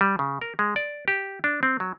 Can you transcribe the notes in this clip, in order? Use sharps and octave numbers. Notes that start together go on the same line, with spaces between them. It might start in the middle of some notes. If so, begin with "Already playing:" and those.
G3
C#3
A#4
G#3
D5
G4
D4
C4
F#3